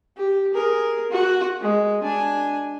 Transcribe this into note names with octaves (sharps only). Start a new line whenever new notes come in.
G4
G#4 A#4
F#4
G#3
D4 G#5